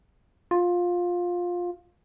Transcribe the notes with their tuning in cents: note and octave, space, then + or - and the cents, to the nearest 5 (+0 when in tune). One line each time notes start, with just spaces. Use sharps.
F4 +15